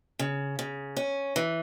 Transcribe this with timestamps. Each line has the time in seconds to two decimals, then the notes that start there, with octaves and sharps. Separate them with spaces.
0.19 C#3
0.59 C#3
0.97 C#4
1.36 E3